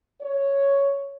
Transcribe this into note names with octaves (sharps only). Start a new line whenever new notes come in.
C#5